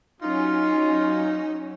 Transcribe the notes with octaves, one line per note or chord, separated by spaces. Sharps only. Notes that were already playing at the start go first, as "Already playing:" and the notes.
F#3 C#4 D#4 F4